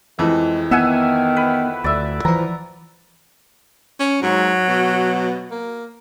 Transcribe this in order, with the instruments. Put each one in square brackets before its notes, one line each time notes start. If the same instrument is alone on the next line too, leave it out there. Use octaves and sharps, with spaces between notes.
[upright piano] F2 E3 [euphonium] G#3
[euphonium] D#3 [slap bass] B3 [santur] E5 F#5 G#5
[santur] B4
[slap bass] D2 [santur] D5 E5
[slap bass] E3 F3 [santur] A#5
[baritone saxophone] C#4
[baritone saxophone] G#2 [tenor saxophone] F#3
[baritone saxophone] B2
A#3